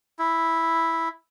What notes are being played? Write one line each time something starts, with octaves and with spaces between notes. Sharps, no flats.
E4